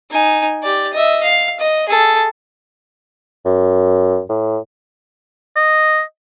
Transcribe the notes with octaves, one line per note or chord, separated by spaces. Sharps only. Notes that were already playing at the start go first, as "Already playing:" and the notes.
D#4 G#5
G4 D5
D#5 E5
F5
D#5
G#4 A4
F#2
A2
D#5